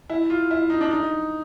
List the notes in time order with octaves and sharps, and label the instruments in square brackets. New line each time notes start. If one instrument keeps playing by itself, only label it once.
[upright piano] E4
F4
E4
D#4
D4
D#4